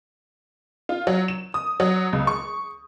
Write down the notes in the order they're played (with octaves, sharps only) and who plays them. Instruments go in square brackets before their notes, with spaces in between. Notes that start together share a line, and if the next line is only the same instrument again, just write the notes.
[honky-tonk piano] F4
F#3
E7
D#6
F#3
C#2
C#6